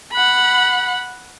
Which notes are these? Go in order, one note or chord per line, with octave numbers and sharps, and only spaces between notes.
F#5 B5